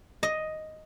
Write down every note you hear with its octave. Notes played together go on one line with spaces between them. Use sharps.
D#5